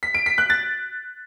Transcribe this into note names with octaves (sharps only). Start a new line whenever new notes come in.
B6
D7
B6
F#6
A6